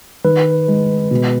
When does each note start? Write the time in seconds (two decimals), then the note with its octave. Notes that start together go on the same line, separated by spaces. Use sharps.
0.24 D#3 B4
0.68 G#3
1.11 B2